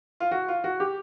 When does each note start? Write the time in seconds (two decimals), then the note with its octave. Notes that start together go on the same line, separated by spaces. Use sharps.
0.20 F4
0.31 F#4
0.48 F4
0.64 F#4
0.80 G4